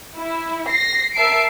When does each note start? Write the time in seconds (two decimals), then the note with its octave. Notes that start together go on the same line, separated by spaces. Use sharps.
0.17 E4
0.69 A#6 C7
1.14 A#4 E5 A5 C7 D7